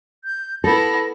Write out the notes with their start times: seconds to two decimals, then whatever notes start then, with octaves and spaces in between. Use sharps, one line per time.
0.25 G6
0.64 B3 E4 A4 A#6